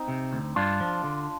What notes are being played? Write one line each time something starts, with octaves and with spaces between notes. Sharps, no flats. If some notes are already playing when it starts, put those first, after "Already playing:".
Already playing: C4 D#4
C3
D2
G2 D4 F4
F3
D3